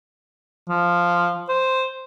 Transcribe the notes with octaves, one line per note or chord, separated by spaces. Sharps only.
F3
C5